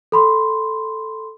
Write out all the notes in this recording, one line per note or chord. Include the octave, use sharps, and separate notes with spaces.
A4 B5 C6